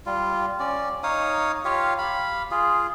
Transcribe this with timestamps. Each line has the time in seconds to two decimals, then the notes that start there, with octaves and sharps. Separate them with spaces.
0.06 G3 F4
0.60 C#4 D5
1.03 D#4 C#5 F5 D#6
1.65 F4 G4 C#5 F5
1.98 F5 B5
2.51 F4 G#4